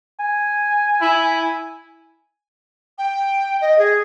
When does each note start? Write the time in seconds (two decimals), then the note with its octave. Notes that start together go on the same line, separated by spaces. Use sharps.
0.20 G#5
1.01 E4
2.98 G5
3.61 D#5
3.78 G#4